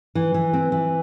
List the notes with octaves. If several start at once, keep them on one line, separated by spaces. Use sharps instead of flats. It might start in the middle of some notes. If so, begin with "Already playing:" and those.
E3
E3
C4
E3